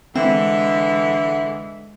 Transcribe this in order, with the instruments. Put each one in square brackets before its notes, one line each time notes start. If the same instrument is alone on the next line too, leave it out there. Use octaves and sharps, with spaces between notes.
[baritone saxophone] D3 [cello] E3 G#3 [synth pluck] C4 [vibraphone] E5